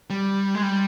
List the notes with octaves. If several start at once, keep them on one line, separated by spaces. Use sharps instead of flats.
G3
G#3
G3